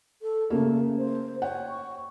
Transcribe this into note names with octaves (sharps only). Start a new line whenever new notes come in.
A4
C#3 A3 A#3
C5
C#5 F#5 G5
C#6